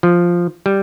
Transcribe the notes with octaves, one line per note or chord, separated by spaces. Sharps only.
F3
G3